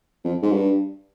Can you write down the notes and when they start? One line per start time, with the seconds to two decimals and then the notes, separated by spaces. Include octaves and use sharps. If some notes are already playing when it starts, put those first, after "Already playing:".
0.25 F2
0.42 G#2
0.53 G2